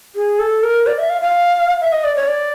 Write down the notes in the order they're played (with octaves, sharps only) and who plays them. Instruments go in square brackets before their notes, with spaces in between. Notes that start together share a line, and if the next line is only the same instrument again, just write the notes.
[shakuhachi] G#4
A4
A#4
D5
E5
F5
F5
E5
D#5
D5
C#5
D5